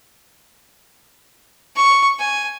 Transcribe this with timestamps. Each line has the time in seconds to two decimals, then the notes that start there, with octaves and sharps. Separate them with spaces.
1.76 C#6
2.19 G#5